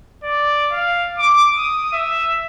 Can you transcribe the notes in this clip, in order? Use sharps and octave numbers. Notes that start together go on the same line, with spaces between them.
D5
F5
D6
D#6
E5